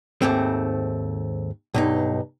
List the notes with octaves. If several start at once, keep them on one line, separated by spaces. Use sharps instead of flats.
D#2 G#2 A3 C4
B1 G2 D#4